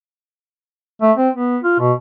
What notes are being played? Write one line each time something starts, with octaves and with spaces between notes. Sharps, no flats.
A3
C4
B3
F4
B2